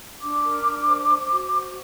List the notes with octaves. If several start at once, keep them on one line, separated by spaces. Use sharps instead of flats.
D4 D6
A#4
D4
C5
C5
F#4
C5